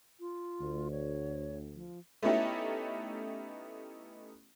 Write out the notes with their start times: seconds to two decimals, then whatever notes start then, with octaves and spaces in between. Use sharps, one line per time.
0.20 F4
0.60 D2
0.91 C#5
1.74 F3
2.23 A3 B3 C#4 D#4 E4 G4